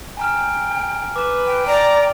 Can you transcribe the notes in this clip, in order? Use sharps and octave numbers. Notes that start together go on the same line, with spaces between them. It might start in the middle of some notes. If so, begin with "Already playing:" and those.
G5 G#5 A#5 F6
B4 D6 E7
G5
D5 A#5